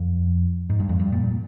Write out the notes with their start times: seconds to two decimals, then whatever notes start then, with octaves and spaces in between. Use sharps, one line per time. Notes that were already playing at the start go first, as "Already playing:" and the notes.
Already playing: F2
0.70 G#2
0.80 G2
0.89 F2
0.99 G2
1.12 A#2